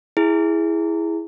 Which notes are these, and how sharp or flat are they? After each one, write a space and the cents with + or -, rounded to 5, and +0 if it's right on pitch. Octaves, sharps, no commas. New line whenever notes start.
E4 +0 G#4 +0